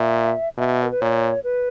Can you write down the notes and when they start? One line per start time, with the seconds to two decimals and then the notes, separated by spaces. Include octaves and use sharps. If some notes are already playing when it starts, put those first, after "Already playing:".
Already playing: A#2 E5
0.58 B2 E5
0.83 A#4
0.91 B4
1.01 A#2 C#5
1.44 B4